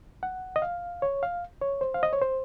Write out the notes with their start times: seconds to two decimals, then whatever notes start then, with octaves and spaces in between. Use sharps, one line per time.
0.23 F#5
0.56 D#5
0.62 F5
1.02 C#5
1.23 F5
1.61 C#5
1.81 C5
1.94 F5
2.03 D#5
2.13 C#5
2.22 C5